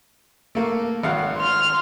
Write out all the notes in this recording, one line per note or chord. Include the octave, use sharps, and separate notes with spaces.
A3 A#3
G#1 F5 F#5
C6 F6